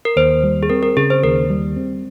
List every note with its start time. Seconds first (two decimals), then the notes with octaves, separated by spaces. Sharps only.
0.05 A#4
0.16 D#2 C5
0.43 G3
0.63 G#4
0.69 C4 A#4
0.83 A#4
0.97 C#3 G#4
1.10 C5
1.23 D#2 A#4
1.50 G3
1.76 C4